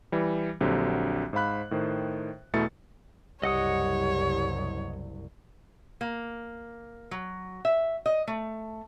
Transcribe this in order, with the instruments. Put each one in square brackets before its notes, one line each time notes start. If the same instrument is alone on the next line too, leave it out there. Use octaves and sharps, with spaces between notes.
[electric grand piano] E3 G3
A#1 D3 F#3 C4 G4
G#2 C5 F5 B5 F#6
A2 D#3 C5
E2 B2 A3 E4 A6 C#7
[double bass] F#1 C2 [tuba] G3 [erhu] C#5 [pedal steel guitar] D#5 F#5 D#6
[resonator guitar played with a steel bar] A#3
F#3
E5
D#5
A3